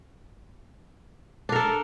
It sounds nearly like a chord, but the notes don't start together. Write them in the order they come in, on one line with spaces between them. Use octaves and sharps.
D4 A#4 A4